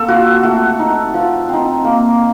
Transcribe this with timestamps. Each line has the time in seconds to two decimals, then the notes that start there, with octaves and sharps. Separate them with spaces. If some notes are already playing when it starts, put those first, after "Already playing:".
Already playing: A#3 C4 A4
0.08 F4 F#4
0.43 A3 F#4
0.79 D#4
1.14 F3
1.49 C4 D#4
1.85 A#3